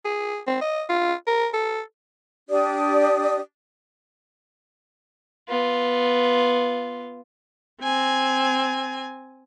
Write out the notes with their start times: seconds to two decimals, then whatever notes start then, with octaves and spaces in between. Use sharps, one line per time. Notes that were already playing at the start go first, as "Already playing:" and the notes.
0.05 G#4
0.47 C4
0.61 D#5
0.89 F4
1.27 A#4
1.53 A4
2.49 D4 G4 D5 D#6
5.49 B3 F4
7.82 C4 G#5